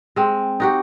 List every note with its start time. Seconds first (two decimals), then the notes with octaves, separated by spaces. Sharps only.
0.16 G#3 C4
0.60 D#4 F#4 G4